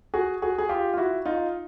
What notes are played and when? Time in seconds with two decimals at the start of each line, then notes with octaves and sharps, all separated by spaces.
0.14 F#4 G#4
0.42 F#4 G#4
0.58 G#4
0.69 F4 G4
0.94 F4
0.97 E4 F#4
1.25 D#4 F4